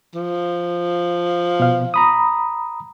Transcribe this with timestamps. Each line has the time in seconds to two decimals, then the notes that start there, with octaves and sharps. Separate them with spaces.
0.15 F3
1.60 B2 F5
1.94 A#5 B5 D#6